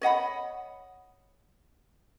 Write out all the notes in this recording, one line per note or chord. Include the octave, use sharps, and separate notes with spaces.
C#5 D#5 F#5 B5